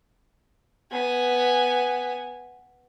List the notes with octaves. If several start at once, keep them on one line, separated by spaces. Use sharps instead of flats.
B3 G#5